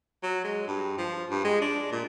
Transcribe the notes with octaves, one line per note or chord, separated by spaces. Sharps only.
F#3
G#3
G2
F3
G2
G#3
D4
A#2